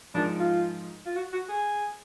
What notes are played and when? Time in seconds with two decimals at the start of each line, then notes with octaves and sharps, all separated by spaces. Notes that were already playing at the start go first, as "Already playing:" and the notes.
0.14 G#2 F3 G#3 D4 D#4 A#4
0.40 F4
1.06 F4
1.16 F#4
1.33 F#4
1.49 G#4